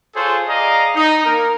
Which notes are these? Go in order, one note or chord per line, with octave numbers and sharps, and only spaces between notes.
F4 G#4 A4 C5 C#5
G#4 D5 D#5 F5 A#5
D#4
A#3 A#4